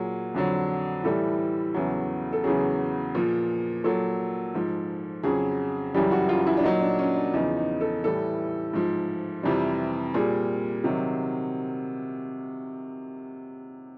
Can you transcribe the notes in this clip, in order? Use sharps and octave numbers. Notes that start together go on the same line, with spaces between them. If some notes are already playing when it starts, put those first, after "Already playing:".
Already playing: A#2 F#3 G#4
F2 D3 F#3
A2 E3 G3 A4
E2 C#3 F#3
A4
E2 C#3 F#3 G#4
A#2 F3
A#2 F#3 A4
G#2 F3
F2 C#3 F#3 G#4
F#2 C#3 E3 G3 G4
F#4
F4
E4
D4
A#2 F#3 D#4
D4
C#4
D4
E2 C#3 F3 D#4
D#4
A4
A2 E3 G3 A4
G#2 F3
F2 C3 E3 G3
A#2 G3 G#4
C3 D#3 F#3